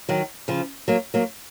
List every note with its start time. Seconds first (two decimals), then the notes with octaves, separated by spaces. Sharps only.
0.09 D#3 F#3
0.48 C#3 F3
0.88 F#3 A#3
1.14 F#3 A#3